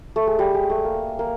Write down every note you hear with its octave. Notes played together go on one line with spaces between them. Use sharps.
A3
G#3
G3
G#3
A3
A#3
A#3